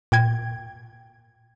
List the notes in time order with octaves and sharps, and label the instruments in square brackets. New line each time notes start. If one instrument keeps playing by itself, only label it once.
[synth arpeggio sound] A#2 G5 G#6